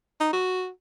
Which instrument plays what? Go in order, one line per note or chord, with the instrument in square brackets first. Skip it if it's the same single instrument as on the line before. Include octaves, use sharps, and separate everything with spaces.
[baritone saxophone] D#4
F#4